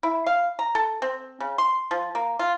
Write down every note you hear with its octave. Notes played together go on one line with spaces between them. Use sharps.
E4
F5
A#5
A4
C4
C#3
C6
F3
A#3
F4